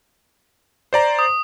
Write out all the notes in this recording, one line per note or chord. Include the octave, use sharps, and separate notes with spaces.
C5 D5 A#5
D#6